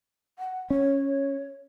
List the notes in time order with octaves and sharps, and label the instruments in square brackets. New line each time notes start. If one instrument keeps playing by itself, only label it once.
[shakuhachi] F#5
[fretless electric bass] C#4 [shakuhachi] C#5